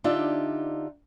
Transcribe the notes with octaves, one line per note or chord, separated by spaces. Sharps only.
D3 D4 D#4 F4 G4 E5